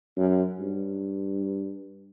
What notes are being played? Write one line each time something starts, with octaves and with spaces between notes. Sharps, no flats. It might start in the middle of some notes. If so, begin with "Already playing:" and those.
F#2
G2